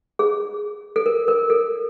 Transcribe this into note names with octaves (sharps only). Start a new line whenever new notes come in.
G#4
A4
A#4
A#4
A4